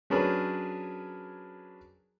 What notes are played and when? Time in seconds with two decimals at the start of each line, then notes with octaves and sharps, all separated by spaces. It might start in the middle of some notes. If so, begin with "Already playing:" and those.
0.10 F#3 C#4 D4 G#4 A#4 B4